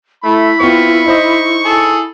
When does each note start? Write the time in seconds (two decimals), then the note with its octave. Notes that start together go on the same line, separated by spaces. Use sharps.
0.24 A3 E4 B5
0.60 B3 C4 F4 C#6
1.06 D#4 C5 D#5
1.65 G#4 A4